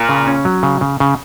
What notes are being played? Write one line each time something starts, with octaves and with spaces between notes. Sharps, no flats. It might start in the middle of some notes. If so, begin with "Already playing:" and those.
Already playing: A#2
C#3
C#4
F#3
C#3
C#3
C#3